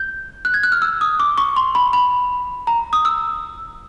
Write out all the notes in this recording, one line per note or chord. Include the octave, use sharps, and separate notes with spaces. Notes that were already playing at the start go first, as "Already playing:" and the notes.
Already playing: G6
F#6
G#6
F#6
F6
E6
D#6
D6
C#6
C6
B5
B5
A#5
D#6
E6